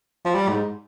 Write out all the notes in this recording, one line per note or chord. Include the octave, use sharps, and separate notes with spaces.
F3
G3
G#2